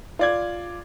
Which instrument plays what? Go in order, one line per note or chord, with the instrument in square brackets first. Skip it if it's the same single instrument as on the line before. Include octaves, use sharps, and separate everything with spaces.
[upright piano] F4 D5 G#6